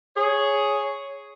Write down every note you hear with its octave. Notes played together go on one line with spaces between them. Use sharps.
G#4 C#5